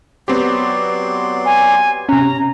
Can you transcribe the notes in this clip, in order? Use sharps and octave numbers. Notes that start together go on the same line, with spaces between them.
F#3 B3 C4 G4 D5 C6
G#5
C3 C#4 A#5